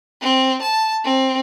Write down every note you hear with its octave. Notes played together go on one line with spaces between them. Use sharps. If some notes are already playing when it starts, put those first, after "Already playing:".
C4
A5
C4